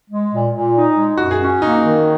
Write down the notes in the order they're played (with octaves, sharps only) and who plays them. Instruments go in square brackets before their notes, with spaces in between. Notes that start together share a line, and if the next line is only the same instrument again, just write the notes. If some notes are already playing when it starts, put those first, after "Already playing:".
[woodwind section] G#3
A#2
A#2
D#4
G#3
[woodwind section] F#2 [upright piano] F#4
[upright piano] G#4
[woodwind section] C#4 [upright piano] F#4
[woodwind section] A#3 [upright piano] D#4
[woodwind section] D#3